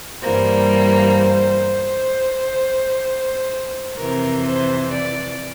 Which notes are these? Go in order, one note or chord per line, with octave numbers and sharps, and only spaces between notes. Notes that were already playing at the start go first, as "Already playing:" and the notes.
G2 E3 G3 A#3 C5
F2 C3 E3 A#4
C5
D5